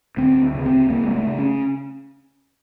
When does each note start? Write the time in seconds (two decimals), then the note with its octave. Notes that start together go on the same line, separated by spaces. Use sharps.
0.17 D2 C4
0.55 C#3
0.66 C4
0.90 C#3 A#3
1.04 G#3
1.15 A3
1.27 C#3
1.39 C#4